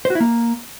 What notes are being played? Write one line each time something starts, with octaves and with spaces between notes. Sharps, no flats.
C5
F#4
E4
A#3